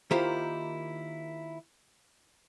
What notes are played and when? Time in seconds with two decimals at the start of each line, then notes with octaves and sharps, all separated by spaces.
0.11 D#3 A#3 E4 F4 G4 C5